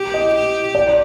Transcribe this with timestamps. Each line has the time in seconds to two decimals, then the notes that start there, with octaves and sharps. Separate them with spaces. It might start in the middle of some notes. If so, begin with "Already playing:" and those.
Already playing: G4
0.14 D#5
0.34 G4
0.75 D5